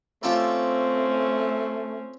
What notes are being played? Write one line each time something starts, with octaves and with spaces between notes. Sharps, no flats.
A3 C4 C#4 F4 G4 A4